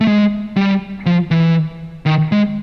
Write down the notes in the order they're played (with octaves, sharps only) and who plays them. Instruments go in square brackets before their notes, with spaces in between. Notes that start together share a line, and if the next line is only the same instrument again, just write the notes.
[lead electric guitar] A3
G#3
G3
F3
E3
D#3
G#3